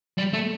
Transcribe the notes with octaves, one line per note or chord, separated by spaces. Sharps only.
G3
A3